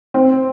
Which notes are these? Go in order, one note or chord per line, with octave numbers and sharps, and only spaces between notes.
C4